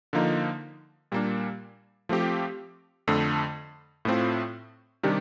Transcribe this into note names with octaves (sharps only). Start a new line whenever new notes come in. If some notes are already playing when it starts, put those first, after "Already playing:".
D3 F3 A#3 D#4
A#2 G3 A#3 D4
F3 A3 C4 G4
F2 D3 A3
A2 A3 C4 F4
C3 D#3 G3 D4 G4